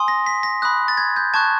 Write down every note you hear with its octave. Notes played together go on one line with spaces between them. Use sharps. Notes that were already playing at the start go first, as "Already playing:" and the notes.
Already playing: G#5 C6 D#6
A#6
B6
A#6
B5 D#6 F#6
A6
G#6
G6
A5 C#6 F#6 G#6